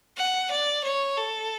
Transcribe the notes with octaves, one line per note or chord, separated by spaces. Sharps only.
F#5
D5
C#5
A4